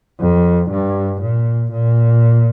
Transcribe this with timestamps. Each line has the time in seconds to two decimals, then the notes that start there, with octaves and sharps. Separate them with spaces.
0.20 F2
0.71 G2
1.22 A#2
1.72 A#2